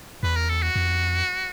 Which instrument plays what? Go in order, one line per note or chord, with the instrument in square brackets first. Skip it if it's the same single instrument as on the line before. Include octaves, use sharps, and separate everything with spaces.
[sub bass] E2 [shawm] B4
[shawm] A#4
A4
F#4
[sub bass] F2